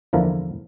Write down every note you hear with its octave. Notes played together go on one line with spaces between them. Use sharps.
E2 D3 F3 A#3 E4 A#4